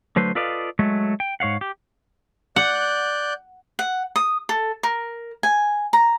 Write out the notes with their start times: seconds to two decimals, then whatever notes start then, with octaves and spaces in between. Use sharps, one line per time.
0.16 D3 F#3 A3 B4 C5
0.35 F4 A4 B4 D5 D#5 F5
0.79 F#3 G#3 A3
1.20 G5
1.40 G#2 C#5 F5 F#5
1.61 G4
2.56 D5 F#5 F#6 G6
3.79 F#5
4.16 D#6
4.49 A4
4.83 A#4
5.43 G#5
5.93 A#5